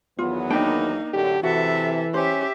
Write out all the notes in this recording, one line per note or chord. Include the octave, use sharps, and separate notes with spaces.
E2 D#3 F#3 B3 F4
A#3 D4 D#4 G5 A5
F#2 A2 D3 G4
C3 E3 F#4 A4 E5 F#5
C#4 G4 C5 E5